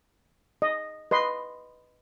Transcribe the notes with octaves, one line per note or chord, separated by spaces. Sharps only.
D#5
B4 D#5 C6